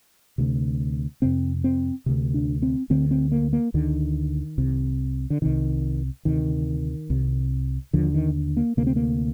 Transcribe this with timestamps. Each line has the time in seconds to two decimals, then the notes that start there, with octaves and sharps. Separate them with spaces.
0.38 D2 C3
1.22 F2 C3 C4
1.64 C4
2.06 D2 C3
2.34 D4
2.62 C4
2.90 D2 D3 C4
3.11 C4
3.32 A#3
3.53 A#3
3.74 D2 D3 D#3
4.58 C2 C3
5.30 D3
5.42 C2 C3 D#3
6.25 D2 C3 D#3
7.10 C2 C3
7.93 D#2 D3 F3
8.14 D#3
8.57 A#3
8.77 D2 C3 A#3
8.87 C4
8.96 A#3